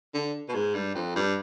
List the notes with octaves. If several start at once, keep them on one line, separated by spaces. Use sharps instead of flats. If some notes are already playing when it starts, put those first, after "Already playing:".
D3
B2
G#2
G2
F2
G2